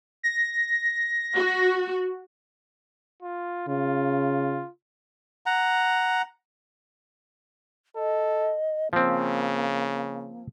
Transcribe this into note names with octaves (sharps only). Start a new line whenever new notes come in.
A#6
F#4
F4
C#3 F4
F#5 A#5
A4 D#5
C#3 F3 A#3 C4